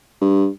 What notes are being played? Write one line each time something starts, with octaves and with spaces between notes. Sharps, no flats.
G2